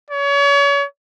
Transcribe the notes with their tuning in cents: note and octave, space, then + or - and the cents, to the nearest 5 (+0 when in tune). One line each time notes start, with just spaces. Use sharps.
C#5 +35